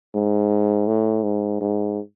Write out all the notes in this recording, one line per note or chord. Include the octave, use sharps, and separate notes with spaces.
G#2
A2
G#2
G#2